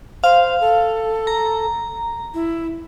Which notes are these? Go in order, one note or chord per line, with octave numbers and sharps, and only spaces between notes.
C5 F5
A4
A#5
E4